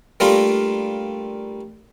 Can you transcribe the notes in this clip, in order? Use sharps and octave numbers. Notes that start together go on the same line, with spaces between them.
G3 A3 A#3 D4 F4